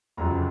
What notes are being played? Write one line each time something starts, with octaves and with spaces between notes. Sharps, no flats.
F1 F2 C#3 F#3 A#5